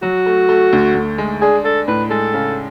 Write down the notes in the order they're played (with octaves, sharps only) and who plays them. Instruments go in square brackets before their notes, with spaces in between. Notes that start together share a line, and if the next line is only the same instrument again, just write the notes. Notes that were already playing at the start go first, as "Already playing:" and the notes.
[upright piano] F#3 [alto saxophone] F#4
[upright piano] A3
A3
D2
D2
G#3
[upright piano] D4 [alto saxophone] G#4
[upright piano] D4 [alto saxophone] A4
[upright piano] A2 [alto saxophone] B4
[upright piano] G#3 [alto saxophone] A4
[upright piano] C#3